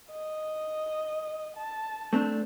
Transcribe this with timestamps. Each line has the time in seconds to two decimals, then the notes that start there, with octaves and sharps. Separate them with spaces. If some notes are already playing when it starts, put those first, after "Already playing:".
0.11 D#5
1.56 A5
2.13 A3 C4 D4